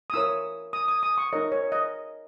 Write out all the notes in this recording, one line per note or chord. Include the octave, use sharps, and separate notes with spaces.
D#6
E4 A#4 C#5 E6
D#6
D#6
D#6
C#6
D#4 A#4 C#5 D#5
C#5
D#5